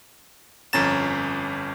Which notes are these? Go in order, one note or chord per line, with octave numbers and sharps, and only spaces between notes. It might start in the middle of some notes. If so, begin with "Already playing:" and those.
G1 F2 C#4 A#5 A6 E7